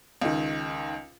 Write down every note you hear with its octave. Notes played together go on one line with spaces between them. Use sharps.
C#2 D#3